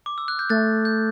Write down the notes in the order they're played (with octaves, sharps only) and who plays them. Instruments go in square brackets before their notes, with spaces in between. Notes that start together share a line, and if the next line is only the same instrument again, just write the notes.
[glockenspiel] D6
E6
F#6
G6
[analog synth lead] A3 [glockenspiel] F#6 A6
[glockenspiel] G6